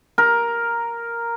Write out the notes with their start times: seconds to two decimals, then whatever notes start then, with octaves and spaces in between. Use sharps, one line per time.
0.18 A#4